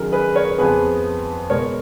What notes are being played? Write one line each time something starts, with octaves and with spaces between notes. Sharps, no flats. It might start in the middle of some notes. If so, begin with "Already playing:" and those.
Already playing: F#2 D#3 F#3 G#4 A#4
G#4 B4
A#4 C#5
F2 F3 B3 G#4 B4
B2 G#3 B3 A#4 C#5